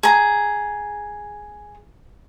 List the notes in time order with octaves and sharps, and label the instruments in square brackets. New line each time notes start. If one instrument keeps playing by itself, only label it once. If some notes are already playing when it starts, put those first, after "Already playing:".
[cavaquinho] G#4 A#5